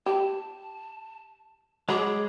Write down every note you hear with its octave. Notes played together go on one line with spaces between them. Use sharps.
G4 A5
F#3 G#3 G#4 B5 D6